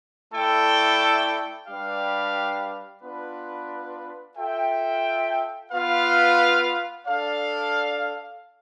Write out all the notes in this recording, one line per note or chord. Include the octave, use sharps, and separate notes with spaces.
A3 E4 A4 D5 G5
G3 D4 G4 B4 F5
B3 D4 F4 B4
F4 A4 E5 G5
B3 F4 B4 F5
D4 A4 D5 F5